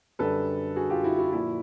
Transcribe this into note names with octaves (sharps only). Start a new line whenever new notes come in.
F#2 D3 G3 A4 B4
F#4 G#4
F4 G4
E4 F#4
E4 F#4
A#2 F3 E4 F#4